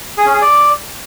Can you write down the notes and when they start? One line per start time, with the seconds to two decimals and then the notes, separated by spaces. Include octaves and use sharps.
0.18 G#4
0.26 C#4
0.34 G#4
0.42 D5